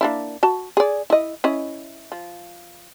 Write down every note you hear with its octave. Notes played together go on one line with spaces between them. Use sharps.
A#3 D4 E4
F#4 A5
G#4 D5
E4 D#5
C#4 E4 D#5
F3